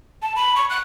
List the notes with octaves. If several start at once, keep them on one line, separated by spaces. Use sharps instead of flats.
A5
B5
C#6
F#6